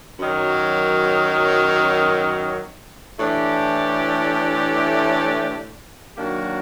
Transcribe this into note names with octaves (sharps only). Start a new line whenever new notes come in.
F#2 D#3 F#3
A2 E3 A3 D4 G4
D#3 F#3 A#3 D4 F#4